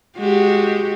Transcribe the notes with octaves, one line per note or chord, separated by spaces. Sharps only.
G#3 F#4 G4